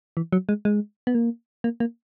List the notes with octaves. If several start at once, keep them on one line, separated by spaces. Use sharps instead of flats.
E3
F#3
G#3
G#3
B3
A#3
A#3
A#3